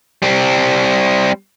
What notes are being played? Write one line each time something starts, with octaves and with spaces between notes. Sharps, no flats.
G3 C4